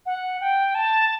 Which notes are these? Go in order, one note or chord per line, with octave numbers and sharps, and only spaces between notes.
F#5
G5
A5